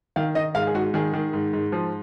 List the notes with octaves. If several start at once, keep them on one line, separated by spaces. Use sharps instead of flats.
D#3 F5
D#3 D#5
G#2 F5
G#4
G#2 F#4
D#3 G#4
D#3
G#2
G#2
F3